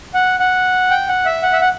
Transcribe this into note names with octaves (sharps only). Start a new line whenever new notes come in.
F#5
F#5
G5
F#5
E5
F#5
E5
F#5